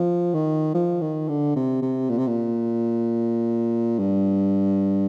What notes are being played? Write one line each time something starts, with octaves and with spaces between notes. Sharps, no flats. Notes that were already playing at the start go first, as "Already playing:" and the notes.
Already playing: F3
D#3
F3
D#3
D3
C3
C3
A#2
C3
A#2
G2